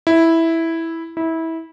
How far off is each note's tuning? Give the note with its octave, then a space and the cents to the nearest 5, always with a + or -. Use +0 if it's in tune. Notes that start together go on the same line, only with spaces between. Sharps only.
E4 -5
E4 -20